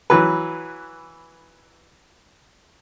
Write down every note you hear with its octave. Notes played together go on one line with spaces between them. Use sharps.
E3 F#3 B4